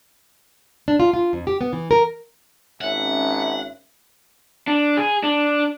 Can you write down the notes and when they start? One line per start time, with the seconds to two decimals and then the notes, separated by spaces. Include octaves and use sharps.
0.88 D4
1.00 F4
1.14 F4
1.33 F2
1.47 G4
1.61 B3
1.73 E3
1.91 A#4
2.81 G#1 C#4 E5 F#5
4.67 D4
4.97 G#4
5.23 D4